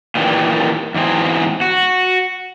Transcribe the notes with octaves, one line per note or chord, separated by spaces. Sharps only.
A#2 D#3 E3 F#3 G3
E2 G#2 E3 C4 G#4
F#4